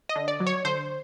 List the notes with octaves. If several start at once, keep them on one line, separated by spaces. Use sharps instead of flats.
D#5
D3
D5
F#3
C#5
D3 C5